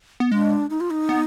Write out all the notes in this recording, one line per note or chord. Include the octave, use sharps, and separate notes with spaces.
B3
G#3 D4
D#4
F4
D#4
B3